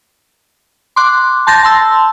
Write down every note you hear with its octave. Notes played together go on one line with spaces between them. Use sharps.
C6 D6 F#6
A5 C6 G6 A6 A#6
A5 C6 E6